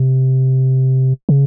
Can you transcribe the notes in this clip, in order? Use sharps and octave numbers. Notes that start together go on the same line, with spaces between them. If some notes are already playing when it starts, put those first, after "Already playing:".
Already playing: C3
C#3